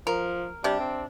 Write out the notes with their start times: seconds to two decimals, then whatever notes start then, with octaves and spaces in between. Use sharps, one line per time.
0.07 F3 A#4
0.64 C3 G3 D4
0.79 C4